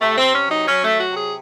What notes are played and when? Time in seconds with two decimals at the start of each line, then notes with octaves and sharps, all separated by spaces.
0.01 C3 A3
0.18 C4
0.23 C3
0.34 C#4
0.45 F#3
0.51 D#4
0.67 F#3 C#4
0.84 F#3 A3
1.00 F#4
1.11 C3
1.17 G#4